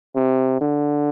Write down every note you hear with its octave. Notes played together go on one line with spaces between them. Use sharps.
C3
D3